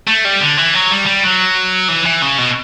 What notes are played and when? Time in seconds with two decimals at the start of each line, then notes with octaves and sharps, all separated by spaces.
0.07 A3
0.25 G3
0.40 D3
0.57 E3
0.74 F#3
0.91 G3
1.06 G3
1.24 F#3
1.88 E3
2.05 E3
2.22 C#3
2.39 B2